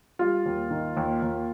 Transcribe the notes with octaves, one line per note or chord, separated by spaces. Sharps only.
G3 F4
D#2
D#3
D#2
D#2